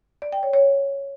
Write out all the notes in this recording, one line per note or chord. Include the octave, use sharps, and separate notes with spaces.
D5
G5
C#5
C#5